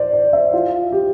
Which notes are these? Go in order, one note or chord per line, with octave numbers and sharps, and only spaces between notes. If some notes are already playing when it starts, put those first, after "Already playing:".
Already playing: C5 D5
D5
E5
F4
G4